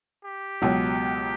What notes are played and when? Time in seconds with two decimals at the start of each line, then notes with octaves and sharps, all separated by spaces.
0.25 G4
0.62 C#2 B2 F#3